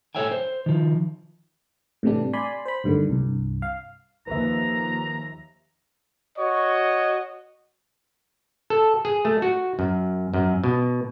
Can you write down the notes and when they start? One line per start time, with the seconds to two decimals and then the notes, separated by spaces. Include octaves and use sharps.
0.15 A4 C#5 E5 G5 G#5
0.32 C5
0.66 D#3 F3
2.03 A2 C3 E3 G3 D4
2.33 D5 G#5 B5 C6
2.66 C5 B5
2.84 D2 G2 D3 D#3
3.10 C2 G2
3.62 F5
4.27 D#2 F3 B4 E5 A#5
6.38 F#4 C#5 D#5 C#6
8.70 A4
9.05 G#4
9.25 A3
9.42 F#4
9.79 F#2
10.34 F#2
10.64 B2